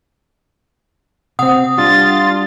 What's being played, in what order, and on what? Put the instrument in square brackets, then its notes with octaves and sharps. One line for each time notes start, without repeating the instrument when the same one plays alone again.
[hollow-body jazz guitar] C3 C4 [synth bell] F#5 D#6
[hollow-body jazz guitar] G3 D4 [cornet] F4 [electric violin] A6